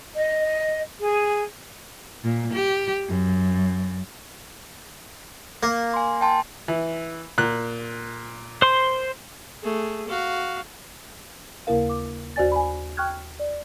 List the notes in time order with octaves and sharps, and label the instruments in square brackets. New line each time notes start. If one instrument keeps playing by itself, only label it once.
[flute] D#5
G#4
[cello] A#2
G4
F#2
[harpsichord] A#3
[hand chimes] G#5 C6
G5 A5 C6
[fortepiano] E3
A#2 F#6
[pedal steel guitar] C5 C6
[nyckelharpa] A3 G#4
F#4 F5
[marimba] D#2 C#3 A#3 E4 A#4 F5
D6
D#2 F#4 C5 D5 G#5 A6
G#5 B5
G5 C#6 F6 F#6 G#6
D5